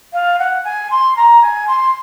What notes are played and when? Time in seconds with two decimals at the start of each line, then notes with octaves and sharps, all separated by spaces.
0.13 F5
0.39 F#5
0.64 G#5
0.91 C6
1.16 A#5
1.42 G#5
1.68 C6